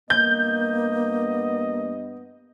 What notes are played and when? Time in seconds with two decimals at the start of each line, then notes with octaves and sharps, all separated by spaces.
0.10 G2 A#3 B3 D#5 G6